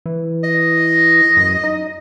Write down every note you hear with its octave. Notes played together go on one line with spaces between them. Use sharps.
E3
D#5
F#2
D#4